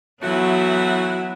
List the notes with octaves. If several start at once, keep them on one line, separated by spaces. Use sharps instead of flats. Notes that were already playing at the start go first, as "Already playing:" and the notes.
E3 F#3 A3 B3 E4 F#4